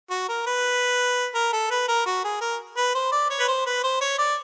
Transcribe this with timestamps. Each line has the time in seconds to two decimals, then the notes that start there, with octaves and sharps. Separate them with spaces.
0.11 F#4
0.29 A#4
0.47 B4
1.35 A#4
1.53 A4
1.71 B4
1.88 A#4
2.06 F#4
2.24 G#4
2.41 A#4
2.77 B4
2.95 C5
3.12 D5
3.30 C#5
3.40 B4
3.48 C5
3.66 B4
3.84 C5
4.01 C#5
4.19 D5